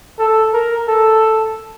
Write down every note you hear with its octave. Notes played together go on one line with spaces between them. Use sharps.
A4
A#4
A4